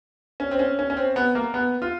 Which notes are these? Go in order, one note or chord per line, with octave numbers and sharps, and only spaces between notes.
C#4
C4
C#4
C#4
C#4
C4
B3
A#3
B3
F4